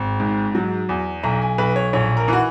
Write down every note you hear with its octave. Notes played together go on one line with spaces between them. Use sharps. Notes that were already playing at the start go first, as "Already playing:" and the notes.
Already playing: G#1
G#2
F#3
E2
B1 A#5
G#5
B1 B4
C#5
A#1 C#5
A#4
E3 F#4